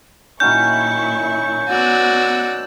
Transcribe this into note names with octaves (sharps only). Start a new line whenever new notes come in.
A#2 D#3 F#3 C#4 E4 C#6 G6
B3 F#4 D5 E6 F#6